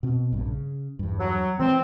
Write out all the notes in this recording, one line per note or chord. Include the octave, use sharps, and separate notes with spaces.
B2 C4
A#1 G2
C#3
E2 G2
F#3
E3 G#3 C4